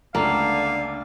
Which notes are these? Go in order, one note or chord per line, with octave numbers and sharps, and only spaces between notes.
C#2 D3 A3 A#3 F5